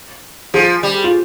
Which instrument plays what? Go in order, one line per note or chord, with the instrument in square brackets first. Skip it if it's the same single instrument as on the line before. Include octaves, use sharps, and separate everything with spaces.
[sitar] F3 [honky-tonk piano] G#4
[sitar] G3
[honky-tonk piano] F4